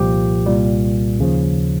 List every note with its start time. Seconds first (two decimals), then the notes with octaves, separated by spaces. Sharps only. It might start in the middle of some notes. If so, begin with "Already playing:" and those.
Already playing: C2 A#2 F3 G4
0.46 C2 A#2 G3
1.19 D#2 C#3 F3